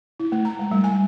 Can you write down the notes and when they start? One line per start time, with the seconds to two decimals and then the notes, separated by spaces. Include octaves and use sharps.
0.20 E4
0.32 A3
0.45 A#5
0.59 G#3
0.71 G3
0.84 G#5